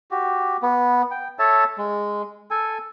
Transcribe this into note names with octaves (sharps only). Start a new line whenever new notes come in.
F#4 G4
B3
G5
A4 C#5 E5 A5
G#3
A4 G#5